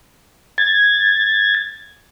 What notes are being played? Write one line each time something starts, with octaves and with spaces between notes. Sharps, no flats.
G#6 A6